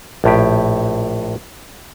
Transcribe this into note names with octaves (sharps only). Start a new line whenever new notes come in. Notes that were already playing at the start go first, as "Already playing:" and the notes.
A#1 A2 G4